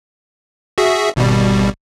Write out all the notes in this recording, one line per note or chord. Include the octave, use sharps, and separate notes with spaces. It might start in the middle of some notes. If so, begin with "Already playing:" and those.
F#4 G#4 E5
G#1 B2 G3